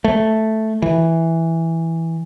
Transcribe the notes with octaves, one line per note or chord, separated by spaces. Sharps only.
A3
E3